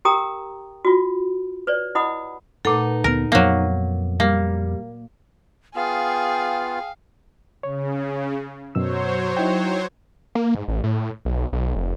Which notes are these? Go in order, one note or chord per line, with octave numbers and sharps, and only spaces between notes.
G4 A#4 G5 A#5 D#6
F4 F#4
B4 C#5 D5
E4 D#5 F#5 B5 D#6
A#2 A3 D#4 A4 B4 F#5
D2 B3 A#4
F2 F#3 A#3 B3
G3 A#3
B3 F4 G#4 F5 G5
C#3 C#5
F#2 B2 F#3 C5 C#5 E6
D#4 E4 G5
A#3
G#2
A1
A2
B1
B1
F1